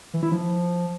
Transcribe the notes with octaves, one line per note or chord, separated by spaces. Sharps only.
E3
E4
F3